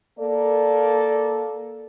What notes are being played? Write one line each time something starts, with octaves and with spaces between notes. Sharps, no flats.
A#3 A4 D5